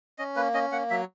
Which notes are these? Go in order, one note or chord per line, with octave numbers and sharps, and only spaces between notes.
C#4 D#5
A#3 B4
C#4 D#5
A#3 F#5
F#3 E5